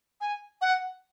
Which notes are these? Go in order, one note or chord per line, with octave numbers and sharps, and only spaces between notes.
G#5
F#5